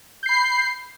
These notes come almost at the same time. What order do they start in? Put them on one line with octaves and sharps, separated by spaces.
G6 C7 B5